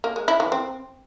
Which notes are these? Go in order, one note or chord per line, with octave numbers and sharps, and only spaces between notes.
A#3
G#3
E4
E3
C4